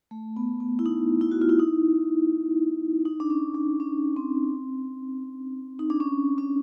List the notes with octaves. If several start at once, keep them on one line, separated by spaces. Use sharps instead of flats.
A3
B3
B3
E4
D#4
E4
F#4
F4
E4
D#4
D#4
D4
C#4
D4
C#4
C4
D#4
D4
C#4
C#4